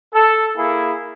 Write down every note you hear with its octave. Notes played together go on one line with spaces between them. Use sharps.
A4
A#3 E4 G#4